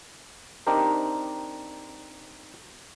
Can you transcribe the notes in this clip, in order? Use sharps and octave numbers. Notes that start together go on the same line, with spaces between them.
C4 D4 D#4 G4 A#4 C5